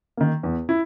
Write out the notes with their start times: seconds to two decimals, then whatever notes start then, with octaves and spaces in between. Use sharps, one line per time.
0.17 D#3 A#3
0.43 E2
0.69 E4